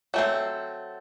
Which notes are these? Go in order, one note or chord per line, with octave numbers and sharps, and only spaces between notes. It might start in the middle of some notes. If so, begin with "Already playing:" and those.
F#3 A3 C4